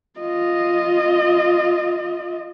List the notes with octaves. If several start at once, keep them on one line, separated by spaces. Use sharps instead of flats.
F4 D#5